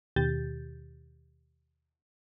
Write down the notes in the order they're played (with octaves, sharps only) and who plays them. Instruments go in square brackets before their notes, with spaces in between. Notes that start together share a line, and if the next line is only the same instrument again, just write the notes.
[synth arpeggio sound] D#2 B2 D#3 G4 G6 A6